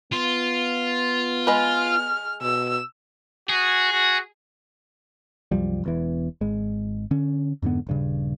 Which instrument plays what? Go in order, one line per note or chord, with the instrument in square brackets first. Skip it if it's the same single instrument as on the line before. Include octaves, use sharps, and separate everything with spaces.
[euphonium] B3 [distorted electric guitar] F4
[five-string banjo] G#3 B4 [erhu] F6
[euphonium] B2 [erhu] E6
[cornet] F#4 [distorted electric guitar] G#4
[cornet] F#4
[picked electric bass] C2 F#2 F3 G3
E1 E2 E3
G#1 G#3
D3 C#4
F2 G#2 D3 B3
D#1 G2 C#3